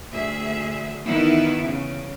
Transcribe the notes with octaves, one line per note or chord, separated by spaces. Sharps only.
D2 G#4 E5
D#3 E3 B3 D#4 E4
C#3